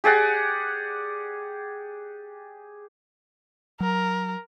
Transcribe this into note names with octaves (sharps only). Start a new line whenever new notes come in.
G4 G#4 D5 F#5
F#3 A#4